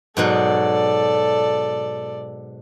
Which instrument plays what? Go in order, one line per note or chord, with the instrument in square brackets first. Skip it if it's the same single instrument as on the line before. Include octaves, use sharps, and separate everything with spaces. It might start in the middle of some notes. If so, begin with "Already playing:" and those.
[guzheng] G#2 B2 F#3 [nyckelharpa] A4 D5